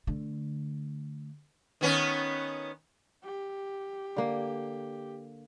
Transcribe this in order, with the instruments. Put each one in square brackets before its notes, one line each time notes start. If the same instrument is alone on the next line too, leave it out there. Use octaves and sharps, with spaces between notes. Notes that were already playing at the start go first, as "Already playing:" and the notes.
[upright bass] D3 A3
[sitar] D#3 B3 C#4
[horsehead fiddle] G4
[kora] D3 A#3